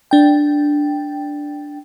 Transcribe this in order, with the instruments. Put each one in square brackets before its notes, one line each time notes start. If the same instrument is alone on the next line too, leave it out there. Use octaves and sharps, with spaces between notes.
[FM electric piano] D4 G5